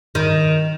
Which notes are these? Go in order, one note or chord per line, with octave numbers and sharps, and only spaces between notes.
D#3